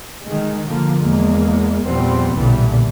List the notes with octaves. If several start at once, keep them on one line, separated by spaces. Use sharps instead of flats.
D#3 G#3
D3 F3 A#3
E2 G#3 A#3
E2 A#2 F3 G3 B3 C4
B1 E2 A#2 D3 E3 G3